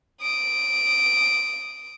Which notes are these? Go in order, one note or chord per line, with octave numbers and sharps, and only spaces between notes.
D#6 D7